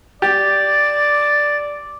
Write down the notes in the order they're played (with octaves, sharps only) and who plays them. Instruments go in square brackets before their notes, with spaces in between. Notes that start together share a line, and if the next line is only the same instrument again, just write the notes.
[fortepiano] G4 [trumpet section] D5 [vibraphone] D6 [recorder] A6